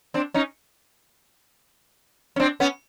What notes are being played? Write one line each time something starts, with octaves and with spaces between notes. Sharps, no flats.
C4 D4
C#4 D#4
C#4
C4 D4
B3 C#4